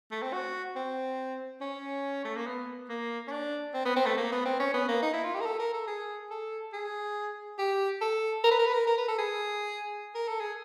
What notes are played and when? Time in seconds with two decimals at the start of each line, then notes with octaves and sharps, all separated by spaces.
0.11 A3
0.22 C4
0.33 F#4
0.76 C4
1.61 C#4
2.24 A3
2.36 A#3
2.47 B3
2.89 A#3
3.27 C#4
3.31 D4
3.74 C4
3.85 B3
3.96 C4
4.06 A3
4.17 A#3
4.32 B3
4.45 C4
4.59 C#4
4.74 B3
4.88 A#3
5.02 D#4
5.13 E4
5.24 F4
5.34 G4
5.41 A#4
5.45 A4
5.59 A#4
5.74 A4
5.87 G#4
6.30 A4
6.73 G#4
7.59 G4
8.01 A4
8.44 A#4
8.51 B4
8.59 A#4
8.66 B4
8.73 A#4
8.87 A#4
8.98 B4
9.08 A4
9.19 G#4
10.15 A#4
10.28 A4
10.40 G#4